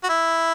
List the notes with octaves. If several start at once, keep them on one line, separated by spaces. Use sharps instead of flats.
F#4
E4